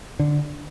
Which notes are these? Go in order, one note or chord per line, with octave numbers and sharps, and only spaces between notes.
D3